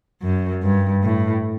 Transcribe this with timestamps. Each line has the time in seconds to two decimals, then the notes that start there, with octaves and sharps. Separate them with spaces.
0.22 F#2
0.63 G2
1.03 A2